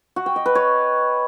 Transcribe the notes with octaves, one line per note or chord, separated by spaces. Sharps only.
F#4
G5
D#5
B4
C#5